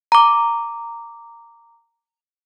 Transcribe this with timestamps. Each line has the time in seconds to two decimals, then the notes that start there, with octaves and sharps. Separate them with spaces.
0.12 A#5 D6